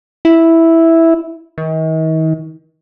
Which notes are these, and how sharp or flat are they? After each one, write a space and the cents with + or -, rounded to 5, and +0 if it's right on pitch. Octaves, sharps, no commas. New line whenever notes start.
E4 -5
D#3 +40